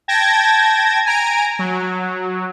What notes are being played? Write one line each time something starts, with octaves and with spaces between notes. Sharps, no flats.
G5 A5 G#6 A#6
G#5 A#5 D7
F#3